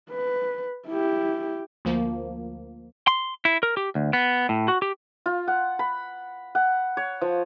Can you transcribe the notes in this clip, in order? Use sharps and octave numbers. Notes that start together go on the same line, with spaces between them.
B4
E4 G4
D2 F3 A#3
C6
E4
A#4
G4
D2
B3
A2
F#4
G4
F4
F#5
B5
F#5
C#5
F3